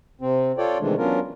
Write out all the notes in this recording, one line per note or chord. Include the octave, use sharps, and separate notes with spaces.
C3 C4
F4 A4 C#5 D5 G5
C3 D#3 E3 G#3 A3 D4
F#3 B3 C#4 D4 F4 A#4